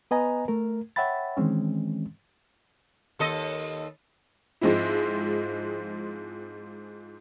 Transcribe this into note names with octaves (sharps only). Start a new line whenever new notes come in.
B3 B4 D#5 G#5 A#5
A3 A#4
C#5 E5 F#5 G5 B5 A6
D#3 E3 G#3 C4 C#4
D#2 A4 D#5
G#2 F3 G#3 C4 E4